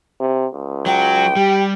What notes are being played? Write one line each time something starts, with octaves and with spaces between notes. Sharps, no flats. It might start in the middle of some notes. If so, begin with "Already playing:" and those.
C3
C#2
F#3 F#4 G5
G3 G4